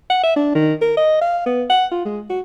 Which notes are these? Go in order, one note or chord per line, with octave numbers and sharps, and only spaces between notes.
F#5
E5
D4
D#3
A#4
D#5
F5
B3
F#5
F4
G#3
F#4